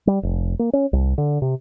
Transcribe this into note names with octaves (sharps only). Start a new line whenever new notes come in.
G3
F1
A#3
C#4
C2
D3
C3